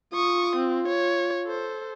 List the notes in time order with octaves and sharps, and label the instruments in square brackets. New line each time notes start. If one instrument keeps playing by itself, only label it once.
[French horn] F4 [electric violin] C#6 D#6
[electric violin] C4
C#5
A4 C5